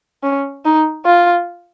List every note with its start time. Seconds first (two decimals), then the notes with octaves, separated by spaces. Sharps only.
0.23 C#4
0.65 D#4
1.05 F4